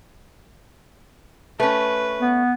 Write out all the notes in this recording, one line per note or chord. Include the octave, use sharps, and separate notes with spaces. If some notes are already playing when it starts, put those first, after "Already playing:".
A3 C#4 B4
B3